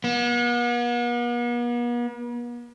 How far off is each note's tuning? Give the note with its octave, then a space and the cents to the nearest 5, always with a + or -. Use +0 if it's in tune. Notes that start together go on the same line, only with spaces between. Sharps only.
B3 -45